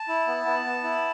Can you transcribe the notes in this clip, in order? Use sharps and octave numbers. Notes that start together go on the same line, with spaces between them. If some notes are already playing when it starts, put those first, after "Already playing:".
Already playing: A5
E4
B3
B3
B3
E4